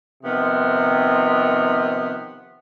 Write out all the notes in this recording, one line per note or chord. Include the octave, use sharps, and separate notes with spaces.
C3 D#3 F3 B3